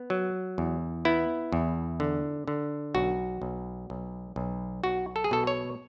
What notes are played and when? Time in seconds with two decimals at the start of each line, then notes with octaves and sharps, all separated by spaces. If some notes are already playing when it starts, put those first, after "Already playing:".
Already playing: B3
0.10 F#3
0.58 E2
1.05 B3 E4
1.52 E2
2.00 D3
2.48 D3
2.95 B1 F#4
3.42 B1
3.90 B1
4.36 B1
4.84 B1 F#4
5.16 A4
5.24 G#4
5.31 B2 A4
5.47 C#5